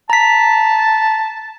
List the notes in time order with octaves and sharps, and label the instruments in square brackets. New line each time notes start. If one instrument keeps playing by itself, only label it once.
[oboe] A5 [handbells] A#5 B6